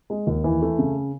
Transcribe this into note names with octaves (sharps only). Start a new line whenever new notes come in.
G#3
D#2
E3
A3
C#3